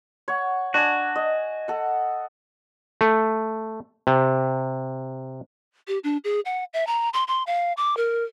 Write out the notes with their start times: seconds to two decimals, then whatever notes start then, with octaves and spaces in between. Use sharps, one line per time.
0.28 C#5 F#5
0.74 D4 F#4 G#5
1.16 D#5
1.68 A4 F#5
3.01 A3
4.07 C3
5.88 G4
6.04 D4
6.24 G#4
6.45 F#5
6.74 E5
6.87 A#5
7.14 C6
7.28 C6
7.47 F5
7.77 D6
7.97 A#4